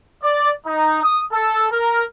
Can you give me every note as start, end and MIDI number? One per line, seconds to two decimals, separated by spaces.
0.24 0.51 74
0.66 1.01 63
1.03 1.23 87
1.32 1.67 69
1.72 2.04 70